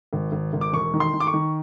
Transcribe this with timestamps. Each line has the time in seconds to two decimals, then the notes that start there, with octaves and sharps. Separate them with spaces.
0.13 G#1
0.32 G#1
0.53 G#1
0.61 D6
0.73 E1 C#6
0.93 D#3
1.00 C6
1.14 D#3
1.20 D6
1.27 C#6
1.33 D#3